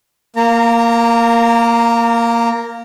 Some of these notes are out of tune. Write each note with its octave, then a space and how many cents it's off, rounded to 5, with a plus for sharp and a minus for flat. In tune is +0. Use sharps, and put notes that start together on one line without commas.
A#3 +0 A#5 -30